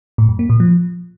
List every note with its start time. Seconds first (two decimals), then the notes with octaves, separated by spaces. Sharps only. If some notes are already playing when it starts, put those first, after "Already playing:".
0.18 A2
0.29 F#2
0.39 A#3
0.50 A#2
0.60 F3